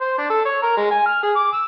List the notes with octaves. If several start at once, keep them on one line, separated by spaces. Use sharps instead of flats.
C5
D4
A4
C#5
A#4
G#3
G#5
F6
G#4
D6
E6